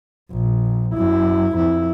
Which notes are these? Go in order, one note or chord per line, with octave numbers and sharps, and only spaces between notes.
A#1
F#2 E4
F2 E4